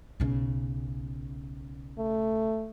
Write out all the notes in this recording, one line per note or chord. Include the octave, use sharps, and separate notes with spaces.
B1 C#3
A3